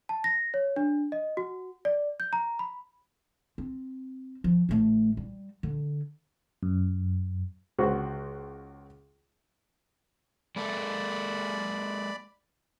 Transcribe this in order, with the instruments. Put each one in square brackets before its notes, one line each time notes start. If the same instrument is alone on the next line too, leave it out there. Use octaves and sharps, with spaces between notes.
[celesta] A5
A#6
C#5
D4
D#5
F#4
D5
G6
A#5
B5
[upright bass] C4
F3
A1 A3
G3
D3
[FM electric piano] F#2
[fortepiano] C#2 F#4 C5
[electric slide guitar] G#3 A#3 A4 [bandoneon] D5 B5